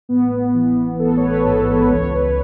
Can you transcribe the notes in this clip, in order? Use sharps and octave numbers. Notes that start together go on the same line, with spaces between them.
A1 B3
E3
A1 A4
C#5
B4
G#2 A4
B4
C#2 C#5
B4